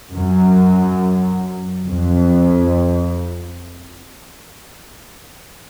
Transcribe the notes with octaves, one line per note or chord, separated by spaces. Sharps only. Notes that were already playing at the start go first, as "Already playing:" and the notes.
F#2
F2